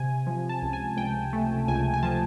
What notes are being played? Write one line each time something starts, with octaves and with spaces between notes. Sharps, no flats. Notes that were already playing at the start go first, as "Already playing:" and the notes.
Already playing: C3 G#5
F3
A5
C#2
G#5
C#2 G5
A3
C#2 G#5
G#5
F3 A5